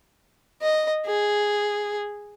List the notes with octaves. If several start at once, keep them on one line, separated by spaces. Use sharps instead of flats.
D#5
G#4